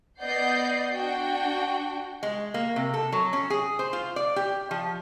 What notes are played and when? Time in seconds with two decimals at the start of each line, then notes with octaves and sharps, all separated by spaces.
0.20 B3 D5 D#5 F#5 G6 C7
0.93 D4 F#4 G5
2.23 G#3
2.54 A#3
2.76 C3
2.94 A4
3.12 F#3
3.33 C#4
3.50 G#4
3.79 C5
3.93 F4
4.16 D5
4.36 G4
4.71 F3